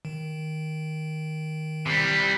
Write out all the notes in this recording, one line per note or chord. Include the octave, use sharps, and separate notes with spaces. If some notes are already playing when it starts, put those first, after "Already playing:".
D#3
C3 G3